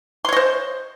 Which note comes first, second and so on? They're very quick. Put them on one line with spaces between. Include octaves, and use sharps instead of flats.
C6 C#5 D#5 C5